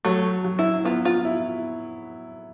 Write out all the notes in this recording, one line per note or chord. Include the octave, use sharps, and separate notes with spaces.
F#3 A3
F#3
E4
B3 F4
F4
E4